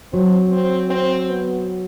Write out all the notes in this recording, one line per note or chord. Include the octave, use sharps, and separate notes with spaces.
F#3 C4
C4
C4
B3